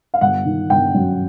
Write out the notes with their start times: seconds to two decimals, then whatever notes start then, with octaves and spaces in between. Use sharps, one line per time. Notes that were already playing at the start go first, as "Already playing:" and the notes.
0.14 F5
0.21 G1 F#5
0.45 D#3
0.70 G1 G5
0.94 F#2